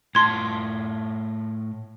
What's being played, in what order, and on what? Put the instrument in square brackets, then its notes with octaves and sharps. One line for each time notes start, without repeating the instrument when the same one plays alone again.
[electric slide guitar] A2 F4 A5 [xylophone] C6 G#6